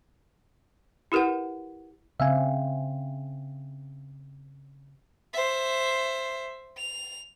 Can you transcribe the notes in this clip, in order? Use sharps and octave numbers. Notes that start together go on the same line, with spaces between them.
E4 G4 A#4 B4 F#5
C#3 C4 E5 F5 G#5
C5 E5
F7